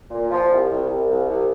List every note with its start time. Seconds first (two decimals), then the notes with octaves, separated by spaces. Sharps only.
0.09 A#2
0.29 F3
0.50 C2
0.69 C2
0.88 C2
1.09 C2
1.29 C2